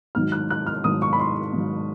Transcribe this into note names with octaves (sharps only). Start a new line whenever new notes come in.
G#2 D#3 F#3 F6
F#6
F#6
F6
G#2 D#3 F#3 D#6
C#6
B5
C6
G#2 D#3 F#3